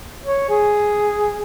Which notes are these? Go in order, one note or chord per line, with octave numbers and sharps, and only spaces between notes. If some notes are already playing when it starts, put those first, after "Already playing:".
C#5
G#4